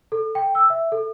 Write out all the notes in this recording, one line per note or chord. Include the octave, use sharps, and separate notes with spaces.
A4
G5
E6
E5
A4